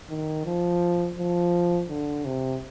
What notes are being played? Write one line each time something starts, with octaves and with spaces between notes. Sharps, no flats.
D#3
F3
F3
D3
C3